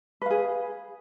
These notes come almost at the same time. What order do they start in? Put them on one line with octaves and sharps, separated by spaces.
B4 F5 G#4